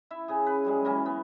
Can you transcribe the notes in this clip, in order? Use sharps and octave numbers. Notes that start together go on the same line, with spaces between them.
E4 E5
C#3 G#4
B4
F#2 G3 G#3
E3 F#3 A#3 C#4
B3